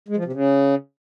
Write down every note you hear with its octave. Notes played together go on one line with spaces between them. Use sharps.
G#3
F3
C3
C#3